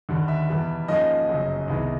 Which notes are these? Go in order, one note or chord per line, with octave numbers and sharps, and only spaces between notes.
D#2 D3 G3
E5
E2 B2 G3 B3
G#2 F3 A#3 C#4 D#5
G1 F#2 C#3 F#3
C2 C3 D#3 G#3 B3